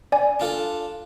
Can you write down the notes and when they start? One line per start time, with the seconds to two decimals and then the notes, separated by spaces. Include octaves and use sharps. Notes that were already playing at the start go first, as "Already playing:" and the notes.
0.12 D5 G#5
0.40 D4 F4 A4